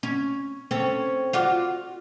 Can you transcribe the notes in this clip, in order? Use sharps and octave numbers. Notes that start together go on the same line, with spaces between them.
C#4
C4 C#4 A4
F4 F#4 D5